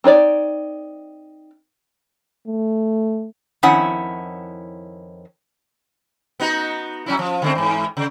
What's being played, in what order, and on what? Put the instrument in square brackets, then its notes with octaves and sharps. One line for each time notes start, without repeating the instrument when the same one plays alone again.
[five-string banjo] C4 D#4 C#5 D5
[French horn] A3
[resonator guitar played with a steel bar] F2 D#3 C#4 E4 C#5 F#5
[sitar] B3 D#4 F#4
F#3 C#4 E4
F3
D3 A3 C4
G#2 E3
C#3